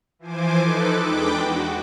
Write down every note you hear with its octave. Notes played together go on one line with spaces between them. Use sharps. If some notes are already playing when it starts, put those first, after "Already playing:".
E3 F3 C5 G#5 D6
D#4 A4 B4 D6
E2 G#3 D4 B4 G5 D6
F#4